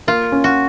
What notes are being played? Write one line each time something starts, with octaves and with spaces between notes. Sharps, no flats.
A#3 F4
C#4
F#4